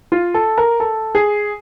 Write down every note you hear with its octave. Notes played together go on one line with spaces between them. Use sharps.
F4
A4
A#4
A4
G#4